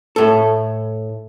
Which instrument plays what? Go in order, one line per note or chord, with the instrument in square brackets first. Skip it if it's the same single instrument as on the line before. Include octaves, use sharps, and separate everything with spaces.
[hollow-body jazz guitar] A2 A4